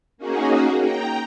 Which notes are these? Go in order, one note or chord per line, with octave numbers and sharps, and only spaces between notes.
A#3 C#4 D#4 F#4 G#4
G5 A#5